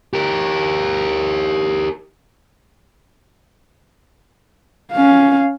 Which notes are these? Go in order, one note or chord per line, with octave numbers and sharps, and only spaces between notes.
G4 A#4
C#4 F5